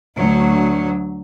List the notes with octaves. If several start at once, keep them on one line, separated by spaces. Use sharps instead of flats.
D2 F#3